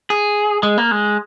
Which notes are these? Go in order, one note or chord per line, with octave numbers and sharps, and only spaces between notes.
G#4
G#3
A#3
G#3